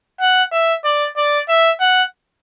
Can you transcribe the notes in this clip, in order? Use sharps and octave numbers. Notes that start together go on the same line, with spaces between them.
F#5
E5
D5
D5
E5
F#5